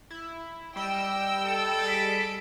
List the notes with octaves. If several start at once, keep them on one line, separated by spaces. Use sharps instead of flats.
E4
G3 D#5 G5 E6
A4
G#4 B6 D7